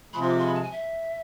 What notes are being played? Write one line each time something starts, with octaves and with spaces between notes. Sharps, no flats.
C3 F3 G#3 B5
C6
D6
C6
B5
A5
G#5
E5